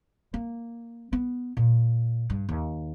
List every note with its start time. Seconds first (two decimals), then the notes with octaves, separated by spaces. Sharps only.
0.34 A#3
1.13 B3
1.57 A#2
2.30 G2
2.49 D#2